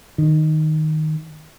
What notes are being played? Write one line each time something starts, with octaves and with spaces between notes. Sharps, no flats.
D#3